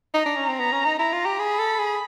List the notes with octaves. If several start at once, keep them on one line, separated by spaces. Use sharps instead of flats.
D#4 A#5
D4
C#4
C4
B3 A#5
C#4
D#4
E4 A#5
F4
G4
G#4 B5
A4
G#4